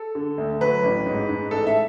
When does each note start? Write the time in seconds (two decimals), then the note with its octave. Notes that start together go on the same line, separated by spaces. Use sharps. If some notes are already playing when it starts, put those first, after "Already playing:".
Already playing: A4
0.15 D3
0.38 D2
0.61 F#3 B4
0.83 A1
1.06 G#2
1.29 G#2
1.51 A1 A4
1.67 E5